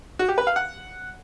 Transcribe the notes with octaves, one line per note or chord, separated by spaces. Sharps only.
F#4
G4
B4
F5
F#5